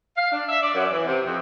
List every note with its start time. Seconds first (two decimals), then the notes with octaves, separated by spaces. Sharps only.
0.17 F5
0.32 D4
0.49 E5
0.63 D5
0.75 F#2
0.92 E3
1.06 C3
1.26 F2